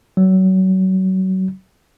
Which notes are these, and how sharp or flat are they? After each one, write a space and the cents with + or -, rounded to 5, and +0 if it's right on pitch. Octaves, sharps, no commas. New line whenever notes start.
F#3 +30